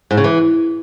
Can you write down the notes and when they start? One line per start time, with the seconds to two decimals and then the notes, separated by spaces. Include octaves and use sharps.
0.11 G#2
0.17 C#3
0.24 E3